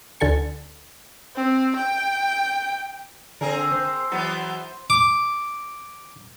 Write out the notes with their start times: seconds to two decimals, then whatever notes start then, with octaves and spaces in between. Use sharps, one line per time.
0.20 D2 D3 A4 G#5 C#7
1.36 C4
1.77 G5
3.41 D3 C4 G#4 A#4
3.72 C5
4.11 E3 F#3 B3
4.90 D6